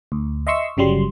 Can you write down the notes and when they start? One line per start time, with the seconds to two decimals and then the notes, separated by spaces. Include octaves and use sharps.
0.12 D2
0.47 D#5 E5 C6 C#6 E6
0.77 G1 C#3 F#3 G3 C6